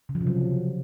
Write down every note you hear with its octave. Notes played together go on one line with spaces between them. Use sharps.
C#3
F3
C3
F#3